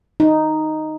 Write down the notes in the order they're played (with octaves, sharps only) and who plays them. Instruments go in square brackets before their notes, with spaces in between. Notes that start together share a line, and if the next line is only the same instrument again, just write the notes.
[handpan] D#4